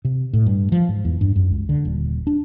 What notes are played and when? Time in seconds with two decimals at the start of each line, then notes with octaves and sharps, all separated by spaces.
0.05 C3
0.33 A2
0.46 G2
0.72 F3
0.89 G#2
1.05 E2
1.21 G2
1.36 F#2
1.51 C#2
1.69 D3
1.85 D#1
2.27 D4